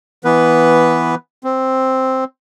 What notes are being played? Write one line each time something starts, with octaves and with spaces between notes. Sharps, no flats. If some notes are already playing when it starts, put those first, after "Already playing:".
E3 B3 B4
C4